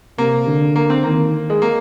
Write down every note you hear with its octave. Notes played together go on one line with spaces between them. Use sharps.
C3 A#3
D3
A#3
C4
D#3 A#3
G#3
A#3